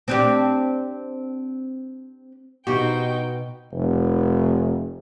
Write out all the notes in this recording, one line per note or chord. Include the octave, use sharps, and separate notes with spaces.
C4 D4 G4
B2 D#4 F#4 G4 C5 G5
F1